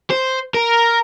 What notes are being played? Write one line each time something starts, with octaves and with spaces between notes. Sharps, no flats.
C5
A#4